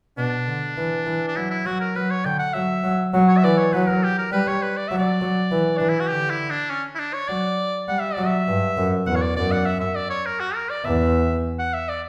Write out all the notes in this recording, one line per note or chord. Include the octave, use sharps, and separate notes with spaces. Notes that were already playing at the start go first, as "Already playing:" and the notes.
B2 D4
D3
E3
E3
D4
F#3 E4
E4
F#3 F#4
A#4
F#3 B4
C#5
D3 G5
F#5
F#3 E5
F#3
F#3
C#5
E5
E3 D5
C#5
F#3 B4
A#4
G4
A#4
G3 B4
C#5
B4
D5
F#3 E5
D5
F#3
E3
E3 D4
E4
F#4
D3 G4
E4
D4
C#4
E4
D4
C#5
F#3 D5
G3 F#5
E5
F#3 D5
E5
G2
F#2
E2 F#5
C#5
D5
F#2 D5
F#5
E5
E5
D5
C#5
A#4
F#4
A#4
D5
E2 E5
F#5
E5
D5